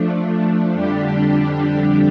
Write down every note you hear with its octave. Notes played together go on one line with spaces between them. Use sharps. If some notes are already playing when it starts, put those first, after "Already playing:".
Already playing: F3 A3 D4
F2 D3 G3 D4 G4